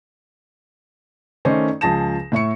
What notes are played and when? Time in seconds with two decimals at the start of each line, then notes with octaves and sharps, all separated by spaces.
1.45 D#3 A3 C#4 C5 D5 D#5
1.81 C#2 F3 G#4 A5 A#6 E7
2.32 A2 E5 C#6 C#7